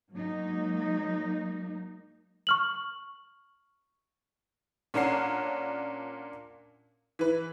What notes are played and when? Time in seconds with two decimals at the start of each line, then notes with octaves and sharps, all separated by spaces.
0.13 F#3 G#3 A#3 D#4
2.47 C#6 F6 F#7
4.94 A#2 C#4 D4 A#4 F#5 C7
7.19 E3 B4